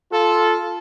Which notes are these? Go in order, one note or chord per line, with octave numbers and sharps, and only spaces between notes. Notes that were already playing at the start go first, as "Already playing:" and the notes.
F4 A4